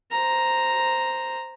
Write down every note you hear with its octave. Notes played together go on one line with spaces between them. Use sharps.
C5 A#5